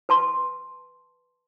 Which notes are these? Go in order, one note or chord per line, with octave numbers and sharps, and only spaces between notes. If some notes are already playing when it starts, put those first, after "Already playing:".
B4 A5 C6